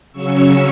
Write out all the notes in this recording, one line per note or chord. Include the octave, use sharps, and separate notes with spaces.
C#3 F#3 C#4 C#6 E6